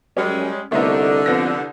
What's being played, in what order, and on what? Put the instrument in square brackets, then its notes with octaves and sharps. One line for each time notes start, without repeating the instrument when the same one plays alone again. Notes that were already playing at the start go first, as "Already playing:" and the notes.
[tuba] F#2 [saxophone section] G3 G#3 [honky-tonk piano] C#4
[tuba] C2 [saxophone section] D3 [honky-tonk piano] A3 B3 D#4
[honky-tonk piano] C2 B3 A#6 [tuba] F2